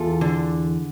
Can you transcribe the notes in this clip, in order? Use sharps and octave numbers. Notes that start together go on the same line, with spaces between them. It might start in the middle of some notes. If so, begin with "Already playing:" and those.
Already playing: E2 F4 A4
D3